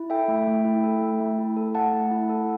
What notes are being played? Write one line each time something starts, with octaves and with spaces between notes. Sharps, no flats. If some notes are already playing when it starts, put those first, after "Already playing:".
Already playing: E4
A4 E5 G5
A3
A3
E4
A4
A3
A3
E4
A4
A3 F#5 A5
A3
E4
A4